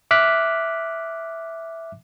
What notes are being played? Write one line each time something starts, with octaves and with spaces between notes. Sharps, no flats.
E5 D6 F6 F#6 B6